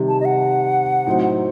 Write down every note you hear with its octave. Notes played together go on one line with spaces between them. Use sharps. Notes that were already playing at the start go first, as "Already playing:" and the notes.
Already playing: C3 D#3 G3
A5
D#5
F#5
A2 F#3 C4 D#4